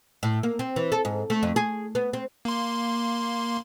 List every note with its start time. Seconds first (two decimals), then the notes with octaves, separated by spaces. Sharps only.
0.23 A2
0.43 A#3
0.59 C4
0.76 E3
0.92 A4
1.05 G#2
1.30 A3
1.43 F2
1.56 G#4
1.95 B3
2.13 C4
2.45 A#3 C6